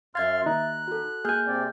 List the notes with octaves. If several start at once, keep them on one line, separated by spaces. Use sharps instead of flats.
F#2 E5 F5 C6 F6 G#6 A6
D#2 D#4 A#5 F#6
F#4 A4
A#3 G#4 G#5 F6 G6
C3 C4 D5